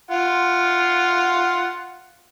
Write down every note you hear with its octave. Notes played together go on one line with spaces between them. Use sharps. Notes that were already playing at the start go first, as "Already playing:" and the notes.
F4 F5 F#5